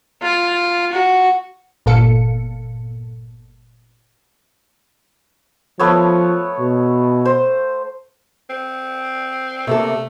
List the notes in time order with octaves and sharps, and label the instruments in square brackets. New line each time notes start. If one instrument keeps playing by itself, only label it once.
[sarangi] F4
F#4
[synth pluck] G1 A#2 A4 F5 C#7
[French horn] F3 [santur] A3 B3 C#5
[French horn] B2
[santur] C5
[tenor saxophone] C4
[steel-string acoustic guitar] C3 A#3 A4 [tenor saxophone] A3